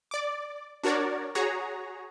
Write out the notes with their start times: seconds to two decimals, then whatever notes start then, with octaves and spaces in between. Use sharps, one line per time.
0.11 D5 D6
0.83 D4 F#4 A#4 C#5 D5
1.35 F#4 G#4 C#5 A#5